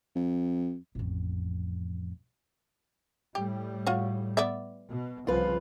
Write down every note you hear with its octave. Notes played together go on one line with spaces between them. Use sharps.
F2
A1 F2
A2 G3 G4
F4 F#4 C#5
B3 D5 E5
B2
C2 C#3 F3 F4 B4